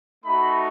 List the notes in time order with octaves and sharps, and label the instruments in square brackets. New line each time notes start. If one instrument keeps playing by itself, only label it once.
[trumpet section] A3 D#4 F#4 B5